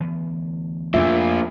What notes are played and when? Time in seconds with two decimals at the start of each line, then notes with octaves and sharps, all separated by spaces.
0.01 D2 E3 B3
0.94 F2 A#2 F3 A3 E5